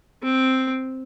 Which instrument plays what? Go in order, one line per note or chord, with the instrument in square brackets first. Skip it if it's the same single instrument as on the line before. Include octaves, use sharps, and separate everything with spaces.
[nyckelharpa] C4